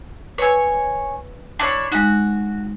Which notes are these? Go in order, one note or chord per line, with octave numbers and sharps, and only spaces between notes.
B4 C#5 G#5 E6
D4 E4 C#5
G#3 D#4 F#4